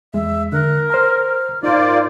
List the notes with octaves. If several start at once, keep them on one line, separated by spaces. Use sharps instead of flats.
E2 G#3 E5
D3 A#4 F#6
C5 A#5 F6
G#2 A#3 D#4 F4 C5 D5 D6